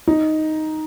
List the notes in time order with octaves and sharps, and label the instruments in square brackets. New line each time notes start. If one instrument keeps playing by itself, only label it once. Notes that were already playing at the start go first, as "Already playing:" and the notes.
[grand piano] D#4